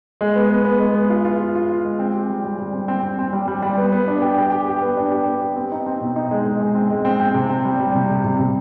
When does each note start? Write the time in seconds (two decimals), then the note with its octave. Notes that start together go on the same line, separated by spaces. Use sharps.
0.21 G#3
0.36 B3
0.50 B3
0.65 B3
0.80 G#3
0.95 B3
1.10 F4
1.25 F4
1.40 F4
1.55 F4
1.69 F4
1.85 G#3
1.99 C4
2.14 G4
2.30 G3
2.44 G3
2.59 G3
2.73 C4
2.88 C4
3.03 C4
3.19 C4
3.33 G3
3.48 G3
3.62 G3
3.78 B3
3.92 B3
4.08 D4
4.22 G4
4.38 G4
4.52 G4
4.66 G4
4.82 B3
4.97 D4
5.12 G4
5.27 B3
5.41 G4
5.56 C4
5.72 D#4
5.87 C4
6.01 B2
6.16 D#4
6.31 G#3
6.46 G#3
6.61 G#3
6.75 C4
6.90 G#3
7.05 C4
7.20 C4
7.34 C3
7.50 C4
7.65 G3
7.80 G3
7.95 C3
8.09 C3
8.24 C3
8.39 C3